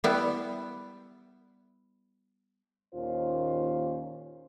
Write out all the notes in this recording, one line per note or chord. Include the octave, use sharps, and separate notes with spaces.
G3 B3 E4
D#2 A#2 D#3 C#4 F4 C5